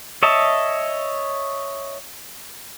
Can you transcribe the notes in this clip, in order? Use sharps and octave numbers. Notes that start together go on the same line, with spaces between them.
C#5 D#5 E5 A5